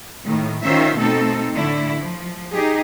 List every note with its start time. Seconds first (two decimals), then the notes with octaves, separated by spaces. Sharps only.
0.24 A2 D#3
0.64 D#3 C#4 F4 C5 E5
0.98 B2 A3 C4 D#4 A4
1.54 A2 D3 A3 E4
1.98 F3
2.51 D#4 G4 G#4